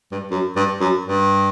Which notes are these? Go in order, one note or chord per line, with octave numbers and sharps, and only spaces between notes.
G2
F#2
G2
F#2
G2